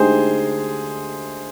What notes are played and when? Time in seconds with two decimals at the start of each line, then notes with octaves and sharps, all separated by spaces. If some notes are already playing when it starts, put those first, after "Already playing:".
Already playing: D2 D3 G#3 D#4 G4 G#4 C5